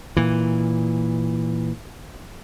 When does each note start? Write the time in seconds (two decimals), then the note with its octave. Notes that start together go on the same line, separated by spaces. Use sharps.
0.17 A#2 E3